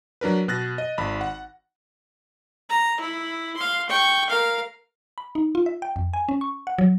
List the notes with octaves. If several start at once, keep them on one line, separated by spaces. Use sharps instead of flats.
F#3 D4 A#4 B4
B2 F#6 A6 A#6
D#5
G#1 B5
F#5
A#5
E4
F5 C6
G5 C#6
A#4 F5
B5
D#4
F4
E5
G5
F2
G#5
C#4
C#6
F#5
F#3